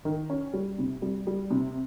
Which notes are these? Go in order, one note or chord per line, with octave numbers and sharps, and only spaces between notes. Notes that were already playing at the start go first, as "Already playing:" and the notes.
D#3
C#4
G3
C3
G3
G3
C3